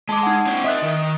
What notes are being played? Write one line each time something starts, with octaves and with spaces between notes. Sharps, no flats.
G#3 A5 D6
D#4 F#5
C4 D4
A#4 D#5 E5 D#6 F#6
D#3